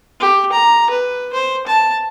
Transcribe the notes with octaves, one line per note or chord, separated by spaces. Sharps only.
G4
A#5
B4
C5
A5